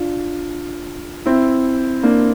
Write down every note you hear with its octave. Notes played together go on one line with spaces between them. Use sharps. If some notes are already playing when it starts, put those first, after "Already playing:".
Already playing: D4 F4
C4 E4
A#3 D4